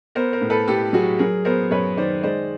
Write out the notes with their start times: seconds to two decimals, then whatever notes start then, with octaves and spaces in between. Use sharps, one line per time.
0.15 B3 A#4 C5
0.33 A#4 C5
0.41 A2
0.50 A4 B4
0.68 A2 G4 A4
0.93 F#3 F#4 G#4
1.19 F#3 G#4 A#4
1.45 B3 A#4 C5
1.71 F#2 B4 C#5
1.97 D#3 C5 D5
2.23 G#3 C5 D5